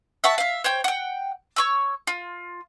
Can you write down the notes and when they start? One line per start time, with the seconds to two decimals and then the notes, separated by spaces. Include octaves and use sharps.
0.24 E5 F#5 A5 C#6
0.38 E5 F5
0.64 C5 C#5 G5
0.84 F#5 G5
1.56 C#5 C#6 E6
2.07 F4